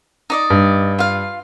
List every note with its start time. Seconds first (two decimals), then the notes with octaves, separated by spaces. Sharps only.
0.30 D#4 D5 D#5
0.50 G2
0.99 F4 F5